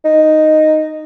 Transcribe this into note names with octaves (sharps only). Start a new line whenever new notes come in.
D#4